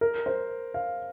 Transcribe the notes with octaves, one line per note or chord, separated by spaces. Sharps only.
A#4
C5
F5